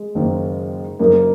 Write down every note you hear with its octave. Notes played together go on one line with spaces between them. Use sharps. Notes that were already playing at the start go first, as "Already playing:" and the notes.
Already playing: G#3
F#1 F#2 D#3 A#3
F#1 F#2 C#3 F#3 A#3 D#4